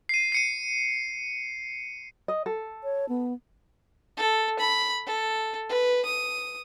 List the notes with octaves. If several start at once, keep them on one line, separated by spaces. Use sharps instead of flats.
C7 D#7
C7 C#7 D#7
D#5
A4
C#5
B3
A4
B5
A4
B4
D#6